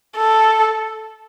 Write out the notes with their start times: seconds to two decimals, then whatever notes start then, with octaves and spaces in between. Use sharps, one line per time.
0.17 A4